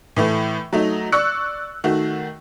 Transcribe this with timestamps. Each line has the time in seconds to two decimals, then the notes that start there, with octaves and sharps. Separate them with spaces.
0.16 A2 E3 A3
0.73 F#3 A3 D#4
1.12 D5 C#6 E6 F#6 C#7
1.84 D#3 A3 F#4